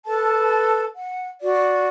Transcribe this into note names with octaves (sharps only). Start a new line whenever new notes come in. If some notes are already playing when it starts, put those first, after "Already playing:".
A4 B4 A5
F#5
F#4 D5